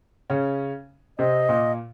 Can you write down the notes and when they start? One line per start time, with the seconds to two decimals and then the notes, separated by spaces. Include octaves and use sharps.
0.30 C#3 C#4
1.19 C3 C4 D#5
1.49 A#2 A#3